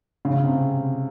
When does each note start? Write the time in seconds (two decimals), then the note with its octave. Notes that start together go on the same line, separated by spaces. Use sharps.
0.25 C#3
0.44 C3